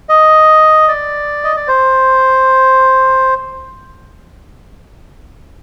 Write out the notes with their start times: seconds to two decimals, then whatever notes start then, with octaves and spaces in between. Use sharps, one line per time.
0.09 D#5
0.88 D5
1.44 D#5
1.56 D5
1.68 C5